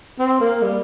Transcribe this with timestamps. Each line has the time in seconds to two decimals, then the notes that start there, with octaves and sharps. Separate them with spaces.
0.19 C4
0.41 A#3
0.63 G3